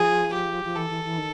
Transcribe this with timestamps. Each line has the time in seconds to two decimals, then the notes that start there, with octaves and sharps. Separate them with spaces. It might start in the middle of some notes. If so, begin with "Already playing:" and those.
Already playing: F3 G#4
0.34 G4
0.64 F3
0.76 E3 A4
0.90 E3
1.04 E3
1.18 D#3